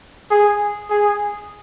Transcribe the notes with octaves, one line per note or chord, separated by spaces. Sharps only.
G#4
G#4